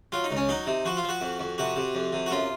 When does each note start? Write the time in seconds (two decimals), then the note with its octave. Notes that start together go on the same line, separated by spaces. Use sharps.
0.12 F#3 F4
0.24 D#4
0.31 C#2
0.37 C#4
0.49 F#3 D#4
0.67 C3
0.85 F3 F#4
0.97 F4
1.03 F3
1.09 F#4
1.21 F2
1.40 F2
1.58 C3 F#4
1.76 C3
1.95 F2
2.13 C3
2.26 F#4
2.31 F#2 F4